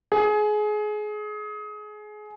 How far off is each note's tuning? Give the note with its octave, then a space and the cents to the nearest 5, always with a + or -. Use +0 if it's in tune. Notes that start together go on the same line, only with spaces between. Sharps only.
G#4 +25